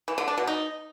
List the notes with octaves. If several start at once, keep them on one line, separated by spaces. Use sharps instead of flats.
E3
D3
D4
B2
D#4